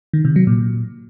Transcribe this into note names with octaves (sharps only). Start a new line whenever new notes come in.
D#3
C3
F#3
A#2